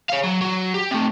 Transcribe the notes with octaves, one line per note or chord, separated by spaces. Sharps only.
C#5 F5
F#3
F#3
G4
C3 A3